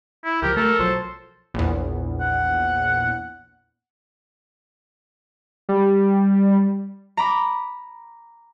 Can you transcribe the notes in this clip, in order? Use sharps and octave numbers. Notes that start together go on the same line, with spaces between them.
E4
C#2 F3 G4 A#4
A3 A4 A#4
B1 F3 F#3 C5
A#1 E2
F#5
G3
A#5 B5 D6